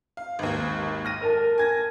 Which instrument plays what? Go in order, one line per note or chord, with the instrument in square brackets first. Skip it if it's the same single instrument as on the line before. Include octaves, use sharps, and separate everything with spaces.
[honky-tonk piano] F5
G#1 D#2
F6 A#6 D#7
[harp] A#4 A5
[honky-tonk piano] G#5 G#6 A#6